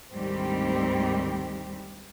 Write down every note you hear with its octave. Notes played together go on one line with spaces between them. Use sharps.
D2 G#2 D#3 G3 C4 G4